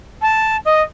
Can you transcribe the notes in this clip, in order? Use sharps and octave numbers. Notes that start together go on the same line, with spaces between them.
A5
D#5